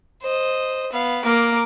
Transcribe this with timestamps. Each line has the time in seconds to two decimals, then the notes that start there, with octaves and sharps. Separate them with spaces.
0.22 C5 D#5
0.92 B3 F5
1.25 A#3 A#4 D6